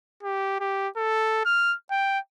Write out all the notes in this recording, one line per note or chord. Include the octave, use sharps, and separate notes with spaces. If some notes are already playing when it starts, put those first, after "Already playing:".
G4
G4
A4
F6
G5